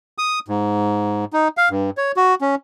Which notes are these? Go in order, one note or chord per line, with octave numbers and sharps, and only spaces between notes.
D#6
G#2
D#4
F5
G2
C#5
F#4
C#4